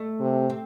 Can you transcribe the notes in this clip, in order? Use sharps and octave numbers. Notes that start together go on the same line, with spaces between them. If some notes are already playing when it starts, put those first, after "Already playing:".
Already playing: A3
C3
C4